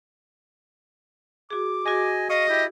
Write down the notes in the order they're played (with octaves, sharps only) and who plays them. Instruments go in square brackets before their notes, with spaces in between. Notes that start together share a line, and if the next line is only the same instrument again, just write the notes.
[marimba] F#4 G#4 [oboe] D6
[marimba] F#4 G#4 [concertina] D#5 G#5
[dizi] D#5 [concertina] F5 C#6 D#6
[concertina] E4 [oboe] G4